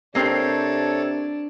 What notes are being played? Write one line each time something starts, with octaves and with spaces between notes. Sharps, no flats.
C3 A#3 C4 D4 G4 A4 C#5